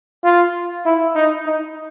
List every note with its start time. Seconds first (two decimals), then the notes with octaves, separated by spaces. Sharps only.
0.24 F4
0.85 E4
1.15 D#4
1.46 D#4